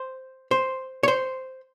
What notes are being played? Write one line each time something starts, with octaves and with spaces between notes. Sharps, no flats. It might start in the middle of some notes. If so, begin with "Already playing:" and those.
Already playing: C5
C5
C#5
C5